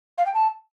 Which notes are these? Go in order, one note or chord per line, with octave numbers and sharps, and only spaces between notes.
F5
G5
A5